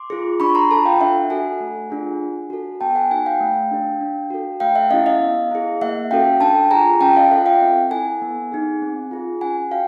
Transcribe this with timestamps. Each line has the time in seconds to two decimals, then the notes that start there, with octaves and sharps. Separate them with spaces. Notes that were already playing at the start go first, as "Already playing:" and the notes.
Already playing: C6 D6
0.10 F4 G#4
0.40 D4 B5 C#6
0.55 A#5 C6
0.71 F4 A4 A5 B5
0.85 F5 G5
1.00 D4 E5 F#5
1.30 F#4 A4 F#5 G#5
1.60 A3
1.90 D4 F4 G#4
2.20 D4
2.50 F#4 A4
2.81 B3 G5 A5
2.95 F#5 G#5
3.10 D#4 F#4 A4 F#5 G#5
3.26 F5 G5
3.41 A3
3.71 D4 G4
4.01 D4
4.30 F#4 A4
4.60 A3 F5 G5
4.75 E5 F#5
4.90 C#4 E4 G4 D#5 F5
5.06 D#5 F5
5.20 B3
5.51 E4 G#4
5.81 A#3 E5 F#5
6.11 C#4 F#4 A4 F5 G5
6.41 D4 G5 A5
6.71 F4 G#4 G#5 A#5
7.01 C#4 G5 A5
7.16 D#5 F5
7.31 F4 A4 E5 F#5
7.46 F5 G5
7.62 C4
7.91 E4 A4 F#5 G#5
8.22 B3
8.52 D#4 G#4
8.82 C4
9.11 F4 G#4
9.41 C#4 F#5 G#5
9.71 F#4 F5 G5